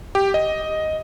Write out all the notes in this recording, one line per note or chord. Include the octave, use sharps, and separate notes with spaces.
G4
D#5